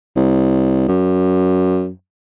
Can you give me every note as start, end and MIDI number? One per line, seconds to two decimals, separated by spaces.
0.16 0.89 36
0.89 1.89 42